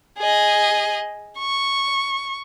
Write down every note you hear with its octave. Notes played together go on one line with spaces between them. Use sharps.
G#4 D#5
C#6